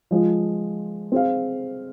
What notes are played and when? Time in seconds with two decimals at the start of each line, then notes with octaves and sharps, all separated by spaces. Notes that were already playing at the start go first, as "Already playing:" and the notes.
0.11 F3 G#3 F4
1.12 C4 G#4 F5